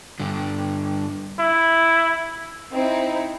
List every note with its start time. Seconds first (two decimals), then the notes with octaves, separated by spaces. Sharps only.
0.20 G2 D3
1.40 E4
2.72 C4 D#4 E4